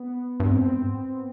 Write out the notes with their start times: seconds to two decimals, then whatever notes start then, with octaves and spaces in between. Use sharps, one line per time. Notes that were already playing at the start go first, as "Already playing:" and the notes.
Already playing: B3
0.40 G2
0.46 G#2 C4